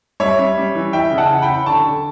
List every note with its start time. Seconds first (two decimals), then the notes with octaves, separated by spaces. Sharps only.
0.20 G3 C#5 E5
0.38 C#4
0.57 G3
0.75 E3
0.93 E3 E5 G5
1.11 C#3
1.18 F#5 A5
1.31 E3
1.42 G5 B5
1.49 C#4
1.66 D3 A5 C#6
1.85 D3